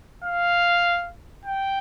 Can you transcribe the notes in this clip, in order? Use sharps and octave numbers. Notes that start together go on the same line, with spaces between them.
F5
G5